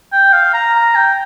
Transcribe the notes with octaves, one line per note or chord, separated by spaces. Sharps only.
G5
F5
A#5
A#5
G5